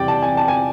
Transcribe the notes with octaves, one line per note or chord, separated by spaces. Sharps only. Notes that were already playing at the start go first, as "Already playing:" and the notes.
Already playing: E2 C3 E3 G3 D5 G5
A5
G#5
A5
G#5